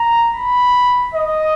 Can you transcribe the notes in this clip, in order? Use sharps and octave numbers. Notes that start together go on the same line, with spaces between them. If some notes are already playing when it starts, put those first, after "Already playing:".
Already playing: A#5
B5
D#5